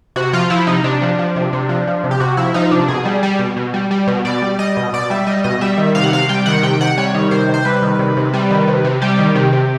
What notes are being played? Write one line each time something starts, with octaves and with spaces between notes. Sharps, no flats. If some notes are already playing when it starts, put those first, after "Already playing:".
C3 F#4
F3 F4
F3 E4
C3 D#4
C3 D4
F3
F3
C3
C3
F3
F3
C3
G4
C3 F#4
F3 E4
F3 D#4
C3 D4
B2 G#4
G3
G3
B2
B2
G3
G3
B2
B2 D5
G3
G3 D#5
B2
B2 D5
G3 E5
G3 D#5
B2 D#5
G3 E5
D#3
C3 F5
F#5
C3 F5
G3 G5
D#3 F#5
C3 G5
C3 F#5
G3 C#5
D#3
C3 C5
C3
C5
G3 B4
D#3
C3
C3
G3
D#3
C3
C3
G3 G4
D#3
C3
C3